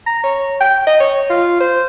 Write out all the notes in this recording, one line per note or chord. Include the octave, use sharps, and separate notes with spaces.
A#5
C#5
G5
D#5
C#5
F4
C5